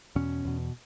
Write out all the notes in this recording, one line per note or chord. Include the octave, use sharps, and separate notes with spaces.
E2 B2 C#4
E2 B2